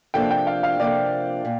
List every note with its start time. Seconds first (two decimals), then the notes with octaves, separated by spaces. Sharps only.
0.14 C3 F3 A#3 D4 A4 G5
0.31 G5
0.47 F5
0.63 F5
0.80 C3 F3 A#3 D4 A4 D5
1.45 A#2